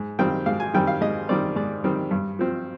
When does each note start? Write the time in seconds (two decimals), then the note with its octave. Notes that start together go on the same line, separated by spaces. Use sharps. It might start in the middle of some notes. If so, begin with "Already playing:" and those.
Already playing: G#2
0.19 D#3 G3 C4 G5
0.46 G#2 F5
0.60 G#5
0.74 D#3 G3 C4 G5
0.87 F5
1.01 G#2 D#5
1.29 D#3 G3 C4 D5
1.56 G#2 D5
1.84 D#3 G3 C4
2.11 G2
2.39 F3 C4